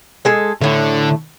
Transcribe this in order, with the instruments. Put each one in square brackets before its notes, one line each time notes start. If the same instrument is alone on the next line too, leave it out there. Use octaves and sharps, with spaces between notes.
[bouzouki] G#3 G#4 A4
[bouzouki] A2 A3 [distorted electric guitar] D3